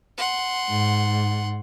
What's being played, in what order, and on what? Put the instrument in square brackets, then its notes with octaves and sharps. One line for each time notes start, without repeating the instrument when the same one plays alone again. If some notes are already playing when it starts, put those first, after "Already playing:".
[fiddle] F#5 C6
[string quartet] G#2